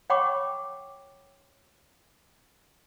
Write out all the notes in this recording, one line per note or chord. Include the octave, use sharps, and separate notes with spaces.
C#5 F#5 G5 B5 C#6 D6